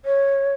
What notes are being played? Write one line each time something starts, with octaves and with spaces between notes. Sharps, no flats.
C#5